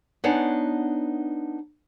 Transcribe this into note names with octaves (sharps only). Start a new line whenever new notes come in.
B3 D4 D#4 C#5 F#5 G#5